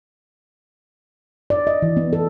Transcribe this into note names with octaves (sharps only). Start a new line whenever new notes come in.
D5
D#5
E3
B3
A4